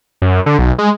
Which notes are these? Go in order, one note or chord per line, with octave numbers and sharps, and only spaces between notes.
F#2
D3
B1
G#3